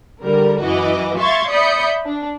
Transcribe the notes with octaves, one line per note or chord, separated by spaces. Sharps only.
D3 G3 A#4
F#2 E3 F#4 D#5 D6
E5 F5 C6 C#6 G#6 A6
D5 E5 B5 D#6 G6 C#7
D4